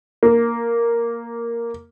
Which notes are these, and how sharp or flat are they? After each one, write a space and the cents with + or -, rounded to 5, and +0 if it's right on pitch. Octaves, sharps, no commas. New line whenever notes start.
A#3 +0